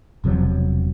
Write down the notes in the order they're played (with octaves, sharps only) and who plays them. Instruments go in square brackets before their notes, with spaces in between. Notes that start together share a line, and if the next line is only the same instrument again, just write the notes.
[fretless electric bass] E1 C3 F3 F#3